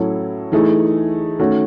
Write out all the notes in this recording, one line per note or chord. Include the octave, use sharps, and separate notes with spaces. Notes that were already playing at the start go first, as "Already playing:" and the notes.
Already playing: A2 F#3 C#4 E4 A4
E3 A3 D#4 G#4
D#3 A3 C#4 F#4